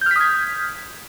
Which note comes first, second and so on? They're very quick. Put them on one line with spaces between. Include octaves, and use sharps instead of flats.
G6 F6 B6 D#6 G#6